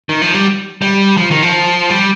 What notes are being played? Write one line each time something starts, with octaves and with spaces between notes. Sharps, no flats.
D#3
F3
G3
G3
F3
D#3
F3
G3